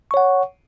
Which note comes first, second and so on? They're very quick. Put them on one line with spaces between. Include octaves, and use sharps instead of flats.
C#6 C#5 F#5